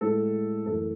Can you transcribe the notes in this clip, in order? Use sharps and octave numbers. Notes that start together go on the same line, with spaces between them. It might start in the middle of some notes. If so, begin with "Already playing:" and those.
A2 G#3 A4
F#2 E3 A3 A4